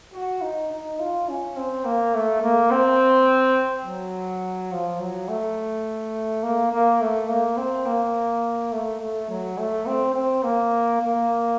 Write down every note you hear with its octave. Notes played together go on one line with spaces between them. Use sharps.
F#4
D#4
D#4
F4
C#4
C4
A#3
A3
A#3
C4
F#3
F3
F#3
A3
A#3
A#3
A3
A#3
C4
A#3
A3
A3
F#3
A3
C4
C4
A#3
A#3